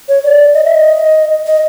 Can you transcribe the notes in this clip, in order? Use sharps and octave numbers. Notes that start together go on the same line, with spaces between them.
C#5
D5
D#5
E5
D#5
D#5